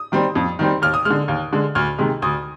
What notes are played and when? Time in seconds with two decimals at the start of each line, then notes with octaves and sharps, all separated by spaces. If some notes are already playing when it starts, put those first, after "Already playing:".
Already playing: D#6
0.12 D#3 G3 C4
0.35 F2
0.59 D#3 G3 C4
0.82 D#2 F6
0.94 D#6
1.05 D3 G#3 F6
1.28 D#2
1.53 D3 G#3
1.75 D2 F6
1.98 C3 D#3 G#3
2.22 D2 D#6